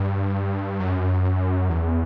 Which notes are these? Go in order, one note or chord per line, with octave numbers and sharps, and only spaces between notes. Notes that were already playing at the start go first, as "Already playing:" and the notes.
Already playing: G2
F#2
E2